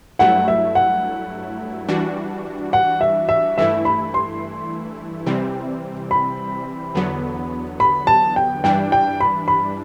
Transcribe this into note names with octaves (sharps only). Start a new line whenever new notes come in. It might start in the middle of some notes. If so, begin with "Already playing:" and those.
G2 F#3 A3 E4 F#5
E5
F#5
E3 G3 D4 F#4
F#5
E5
E5
G2 E3 A3 E4 E5
B5
C6
C3 E3 G3 C4
B5
E2 D3 F#3 B3
B5
A5
G5
G2 E3 G3 D4 G5
G5
B5
B5